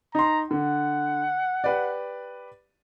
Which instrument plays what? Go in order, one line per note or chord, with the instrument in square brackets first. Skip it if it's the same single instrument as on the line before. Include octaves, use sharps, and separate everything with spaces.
[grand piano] D#4 C6 [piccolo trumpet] A#5
[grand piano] D3 [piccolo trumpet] F#5
[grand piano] G4 B4 D5